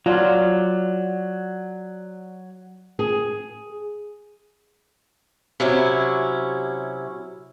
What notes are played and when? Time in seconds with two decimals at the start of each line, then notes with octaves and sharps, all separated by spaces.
0.06 F#3 F4 D5
2.99 G#4
5.60 C3 F#3 C#4 E4